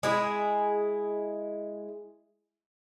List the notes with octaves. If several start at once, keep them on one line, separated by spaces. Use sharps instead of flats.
G#3 E4 G#4